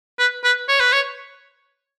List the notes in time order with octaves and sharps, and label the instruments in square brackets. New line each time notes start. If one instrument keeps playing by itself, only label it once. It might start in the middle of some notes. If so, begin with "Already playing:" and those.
[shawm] B4
B4
C#5
B4
C#5